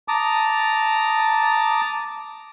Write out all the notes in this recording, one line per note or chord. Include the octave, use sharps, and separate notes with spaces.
A5 A#5 D6 D#6